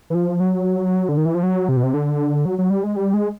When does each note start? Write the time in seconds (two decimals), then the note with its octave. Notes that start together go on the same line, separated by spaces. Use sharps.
0.10 E3
0.15 F3
0.40 F#3
1.09 D3
1.17 D#3
1.25 E3
1.35 F3
1.43 F#3
1.69 C3
1.77 B2
1.83 C3
1.94 D3
2.45 F#3
2.58 F#3
2.70 G3
2.83 G#3
2.96 G3
3.14 G#3